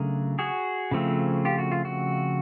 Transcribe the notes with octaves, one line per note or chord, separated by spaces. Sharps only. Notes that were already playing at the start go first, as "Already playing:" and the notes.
Already playing: C#3 F#3 A3 D4 G#4 A#4
F#4 G#4
C#3 F3 A3 C4
F4 G4
F#4
F4
F#4